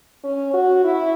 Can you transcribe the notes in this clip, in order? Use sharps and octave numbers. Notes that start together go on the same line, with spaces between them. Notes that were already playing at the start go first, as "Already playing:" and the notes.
C#4
F#4
E4